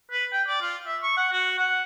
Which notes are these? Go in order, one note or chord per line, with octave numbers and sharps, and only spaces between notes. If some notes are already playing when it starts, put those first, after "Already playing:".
B4
G5
D5
F4
E5
C#6
F#5
F#4
F#5